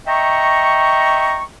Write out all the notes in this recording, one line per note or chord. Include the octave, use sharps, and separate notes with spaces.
D#5 E5 G5 A#5 C#6